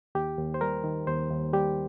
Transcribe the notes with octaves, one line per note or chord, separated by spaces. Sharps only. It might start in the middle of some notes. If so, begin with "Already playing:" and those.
D#2 G4
D#2
C5
G3 A#4
D#3
D#2 C5
D#2
G3 G4